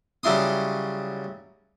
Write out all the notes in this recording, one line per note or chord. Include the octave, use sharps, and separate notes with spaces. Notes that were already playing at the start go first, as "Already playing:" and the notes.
C#3 F#3 G3 E4 C6 D#6